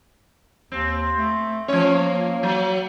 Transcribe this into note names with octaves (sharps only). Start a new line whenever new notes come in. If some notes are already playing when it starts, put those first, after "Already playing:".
D#2 C4
A3
F3 C#4 C#5
A#3
F#3